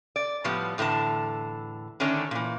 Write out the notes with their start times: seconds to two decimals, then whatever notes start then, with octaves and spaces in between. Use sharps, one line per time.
0.16 D5
0.44 A2 F3 G3 B3
0.78 E2 A2 D3 D#4 A5
2.00 D3 D#3 A3 C#4 D4
2.31 A#2 E3